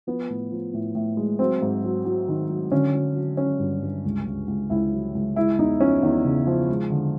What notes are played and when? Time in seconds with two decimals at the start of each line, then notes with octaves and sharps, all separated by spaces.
0.07 F3 B3
0.30 A2
0.52 F3
0.74 A2
0.95 A2
1.17 G#3
1.39 F#3 C4
1.62 G#2
1.84 F#3
2.05 F#3
2.28 D#3
2.50 F#3
2.72 D3 C#4
2.94 F#3
3.16 F#3
3.37 F#3 C#4
3.59 G2
3.83 G2
4.05 C#2
4.27 C#2
4.48 C#2
4.70 C#2 E4
4.92 F#3
5.15 C#2
5.36 G#3 E4
5.58 E2 D#4
5.80 F3 C#4
6.02 E2 D#4
6.25 C#3
6.47 F3
6.69 G#3
6.90 D3